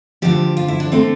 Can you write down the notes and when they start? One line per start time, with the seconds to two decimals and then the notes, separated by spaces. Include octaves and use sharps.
0.22 D2 D3 F3 G4
0.57 F4
0.68 E4
0.80 D4
0.92 D3 A3 C4